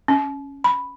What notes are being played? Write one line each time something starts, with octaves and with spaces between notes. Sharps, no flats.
C#4
B5